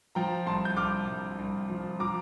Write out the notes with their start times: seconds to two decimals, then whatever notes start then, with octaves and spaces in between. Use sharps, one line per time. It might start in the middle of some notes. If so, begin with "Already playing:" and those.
0.15 F3 G5 A#5
0.46 C2 A5 C6
0.65 G6
0.77 C2 D6 F6
1.07 C2
1.39 C2
1.70 F3
2.00 F3 A#5 D6